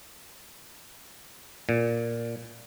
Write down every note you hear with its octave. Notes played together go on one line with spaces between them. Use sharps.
A#2